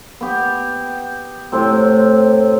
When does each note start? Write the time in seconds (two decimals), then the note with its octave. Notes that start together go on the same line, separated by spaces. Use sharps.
0.21 B3 G4
1.52 A2 C3 C4